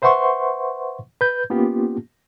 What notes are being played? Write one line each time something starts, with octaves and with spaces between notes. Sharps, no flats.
B4 C5 E5 F#5 C6 C#6
B4 G6
A#3 B3 C#4 F4 G4